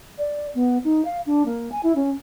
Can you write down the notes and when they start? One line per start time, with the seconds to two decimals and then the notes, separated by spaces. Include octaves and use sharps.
0.18 D5
0.55 B3
0.84 D#4
1.05 F5
1.27 D4
1.46 A#3
1.72 G#5
1.83 E4
1.95 C#4